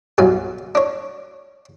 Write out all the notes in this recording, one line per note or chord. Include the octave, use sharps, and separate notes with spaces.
B1 G2 F#3 G#5
D4 C#5